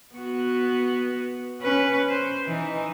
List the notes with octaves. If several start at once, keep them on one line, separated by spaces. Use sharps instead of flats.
B3 F#4
C#4 B4
C5
E3 D#4